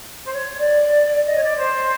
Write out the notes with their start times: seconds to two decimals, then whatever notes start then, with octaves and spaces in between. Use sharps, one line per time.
0.25 C5
0.35 C#5
0.58 D5
1.27 D#5
1.36 C#5
1.42 D5
1.57 C5